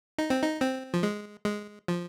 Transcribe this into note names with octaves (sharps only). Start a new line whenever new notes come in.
D#4
C4
D#4
C4
F3
G#3
G#3
F3